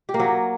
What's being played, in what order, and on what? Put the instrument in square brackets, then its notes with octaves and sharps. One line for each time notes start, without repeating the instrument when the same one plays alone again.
[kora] G4
A#3
F#3